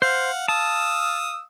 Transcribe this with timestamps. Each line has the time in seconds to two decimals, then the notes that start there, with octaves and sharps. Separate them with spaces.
0.02 C5 F5 F#5
0.48 F5 A5 D#6 E6